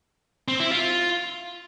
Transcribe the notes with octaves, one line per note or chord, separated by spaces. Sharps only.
C4
E4
F4